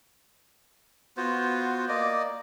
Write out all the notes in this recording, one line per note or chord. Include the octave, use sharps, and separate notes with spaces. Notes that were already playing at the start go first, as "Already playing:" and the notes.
B3 F4 F#4 C5
A#3 D5 D#5